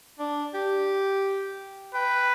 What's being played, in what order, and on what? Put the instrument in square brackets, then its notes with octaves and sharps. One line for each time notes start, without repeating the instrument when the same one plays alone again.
[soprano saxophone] D4
G4
[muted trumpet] B4 [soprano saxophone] G5